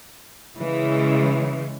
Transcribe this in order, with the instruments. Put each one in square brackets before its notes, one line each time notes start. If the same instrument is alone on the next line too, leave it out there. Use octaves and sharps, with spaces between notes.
[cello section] C#3 E3 G#3